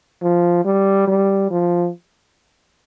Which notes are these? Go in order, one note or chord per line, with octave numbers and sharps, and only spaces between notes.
F3
G3
G3
F3